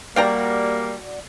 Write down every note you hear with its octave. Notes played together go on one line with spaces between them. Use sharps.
G3 A#3 D4 F#4 D5 F5 G5 A#5